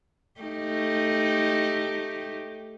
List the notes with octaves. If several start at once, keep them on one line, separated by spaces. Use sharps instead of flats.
A3 D#4 G4